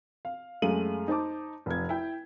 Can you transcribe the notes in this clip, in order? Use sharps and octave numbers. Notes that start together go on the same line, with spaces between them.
F5
F#2 G#3 A3 F5 D#7 F#7
D#4 C5 A5 D6
F1 F3 G#6
E4 G5